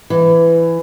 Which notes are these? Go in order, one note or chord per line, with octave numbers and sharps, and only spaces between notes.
E3